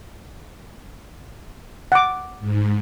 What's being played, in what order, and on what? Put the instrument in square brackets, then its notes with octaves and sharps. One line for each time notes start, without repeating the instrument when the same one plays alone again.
[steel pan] F#5 D6
[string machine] G#2